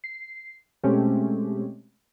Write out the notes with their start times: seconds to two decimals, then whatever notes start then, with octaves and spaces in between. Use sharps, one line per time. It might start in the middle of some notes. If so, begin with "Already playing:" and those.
0.04 C7
0.84 B2 G#3 A3 C4 C#4 G4